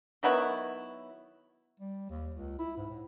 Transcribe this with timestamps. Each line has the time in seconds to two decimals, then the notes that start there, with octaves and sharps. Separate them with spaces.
0.23 D#3 F#3 B3 E4
1.80 G3
2.10 D#2
2.34 C#2
2.59 E4
2.77 G#2
2.90 A2